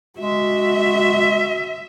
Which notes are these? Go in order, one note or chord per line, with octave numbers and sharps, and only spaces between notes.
G#3 F#4 E5